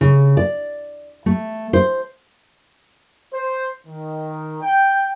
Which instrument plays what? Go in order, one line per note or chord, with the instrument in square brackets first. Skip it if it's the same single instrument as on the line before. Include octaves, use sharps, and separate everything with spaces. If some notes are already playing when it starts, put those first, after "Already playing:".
[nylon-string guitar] C#3
D5
A3
C5
[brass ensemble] C5
D#3
G5